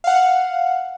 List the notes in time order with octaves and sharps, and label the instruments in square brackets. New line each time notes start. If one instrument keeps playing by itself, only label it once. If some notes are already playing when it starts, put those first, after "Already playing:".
[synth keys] F5 F#5